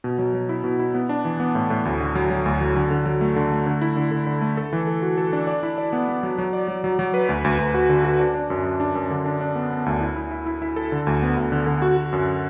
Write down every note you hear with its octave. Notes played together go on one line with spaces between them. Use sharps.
B2
F#3
F#3
E4
B2
E4
B3
D4
E3
B3
A2
A2
D2
D3
F#3
F#3
D2
F#3
D3
D3
F#3
A3
D3
A3
D3
E4
D3
D3
D3
A3
A4
E3
A4
F#4
A4
D4
D5
E4
D5
B3
B3
F#3
F#3
D5
F#3
F#3
F#3
B4
D2
D2
D2
F#4
D3
F#4
D4
D4
F#2
F#2
D4
F#2
D3
D4
D4
B3
B3
D2
E4
E4
E4
E4
E4
A4
D3
D2
B3
D2
D3
D3
F#4
F#4
F#2